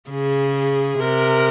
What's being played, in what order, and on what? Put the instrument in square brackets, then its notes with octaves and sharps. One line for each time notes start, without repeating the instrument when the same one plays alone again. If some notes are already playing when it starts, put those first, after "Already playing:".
[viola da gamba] C#3 [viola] G#4
[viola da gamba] C3 [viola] A#4